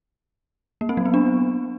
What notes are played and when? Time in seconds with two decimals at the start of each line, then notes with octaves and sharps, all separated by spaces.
0.81 A#3
0.89 C4
0.97 F#3
1.05 B3
1.14 D4